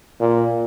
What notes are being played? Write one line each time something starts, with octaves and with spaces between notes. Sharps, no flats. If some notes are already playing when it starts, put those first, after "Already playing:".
A#2